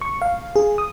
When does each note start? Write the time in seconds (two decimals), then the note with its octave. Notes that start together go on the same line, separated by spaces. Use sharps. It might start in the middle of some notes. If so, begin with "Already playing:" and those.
0.01 C#6
0.22 F5
0.56 G#4
0.78 D#6